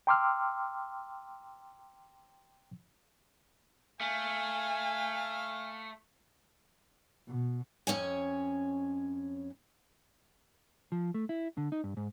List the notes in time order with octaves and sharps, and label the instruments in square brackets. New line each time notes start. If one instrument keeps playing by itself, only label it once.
[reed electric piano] G5 A#5 C6 D6 E6 F6
[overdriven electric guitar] A3 [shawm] F5 [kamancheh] G#5
[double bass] B2
[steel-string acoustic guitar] F2 C#4 C#5 G#5
[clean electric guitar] F3
A3
E4
D3
D#4
G2
G#2